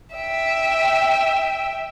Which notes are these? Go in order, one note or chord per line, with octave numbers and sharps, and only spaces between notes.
E5 G5